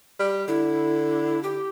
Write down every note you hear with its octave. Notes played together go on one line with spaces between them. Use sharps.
G3
D3 E4
G4